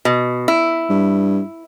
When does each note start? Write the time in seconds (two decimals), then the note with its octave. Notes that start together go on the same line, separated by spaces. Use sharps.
0.05 B2
0.48 E4
0.90 G2